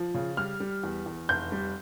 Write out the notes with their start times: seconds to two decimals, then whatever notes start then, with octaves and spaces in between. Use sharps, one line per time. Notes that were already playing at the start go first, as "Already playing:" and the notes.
Already playing: F3
0.14 C#3
0.37 G3 F6
0.60 G3
0.84 E2
1.06 E2
1.29 F1 G6
1.52 G3